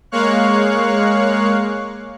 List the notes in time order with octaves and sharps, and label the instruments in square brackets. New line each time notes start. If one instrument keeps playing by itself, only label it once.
[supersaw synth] G#3 A#3 C#5 F5 C#6 F#6